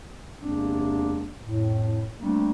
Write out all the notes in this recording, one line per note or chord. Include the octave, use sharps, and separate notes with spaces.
E2 C3 G#3 A#3 C4 D4
F2 A2
G3 A3 A#3 C4 D4